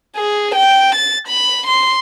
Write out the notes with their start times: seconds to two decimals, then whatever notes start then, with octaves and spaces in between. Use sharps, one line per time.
0.16 G#4
0.55 G5
0.95 A6
1.28 B5
1.67 C6